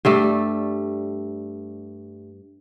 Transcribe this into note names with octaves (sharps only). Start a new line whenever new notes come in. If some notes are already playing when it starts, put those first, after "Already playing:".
G2 G3 A3